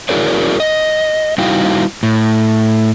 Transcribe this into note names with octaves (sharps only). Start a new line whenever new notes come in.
E4 F#4 G#4 A#4 C#5 D5
D#5
G3 D#4 E4 F#4 F5 G5
A2